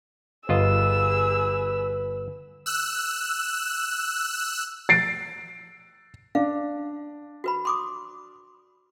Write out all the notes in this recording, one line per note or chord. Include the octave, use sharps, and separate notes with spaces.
G1 F4 G#4 B4 D#5 E6
E6 F#6
A6 C7 D7
D4 F5
F#4 B4 B5
C6 D6 D#6